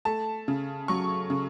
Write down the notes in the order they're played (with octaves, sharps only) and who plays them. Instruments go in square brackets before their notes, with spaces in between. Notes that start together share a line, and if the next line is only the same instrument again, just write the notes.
[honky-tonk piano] A3 A5
C#3
F#3 C#6
C#3